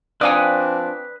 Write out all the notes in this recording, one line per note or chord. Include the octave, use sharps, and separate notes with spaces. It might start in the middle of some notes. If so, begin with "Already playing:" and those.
F3 C4 D4 B4 D5 F5 G#5 D#6